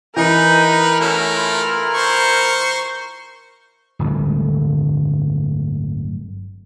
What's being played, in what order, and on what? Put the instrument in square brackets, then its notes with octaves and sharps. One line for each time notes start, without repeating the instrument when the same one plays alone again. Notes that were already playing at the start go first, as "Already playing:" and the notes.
[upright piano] E3 [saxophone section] D#4 [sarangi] A#4 [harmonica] B4
[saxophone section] B2 C#4 E4 [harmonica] A3
[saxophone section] E4 F4
[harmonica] C5 C#6
[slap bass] D1 G1 D2